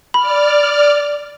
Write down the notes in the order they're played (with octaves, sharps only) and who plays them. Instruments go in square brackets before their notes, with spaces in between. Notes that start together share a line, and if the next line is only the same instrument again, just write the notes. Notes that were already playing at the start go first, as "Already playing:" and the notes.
[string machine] D5 F6 [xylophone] B5